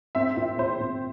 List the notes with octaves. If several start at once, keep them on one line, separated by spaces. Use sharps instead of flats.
C4 E5
A#2 E5
A#2 C5
A#2